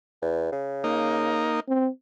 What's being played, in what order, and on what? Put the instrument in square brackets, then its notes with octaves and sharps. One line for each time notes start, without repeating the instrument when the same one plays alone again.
[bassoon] E2
C#3
[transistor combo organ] A#3 D#4
[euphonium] C4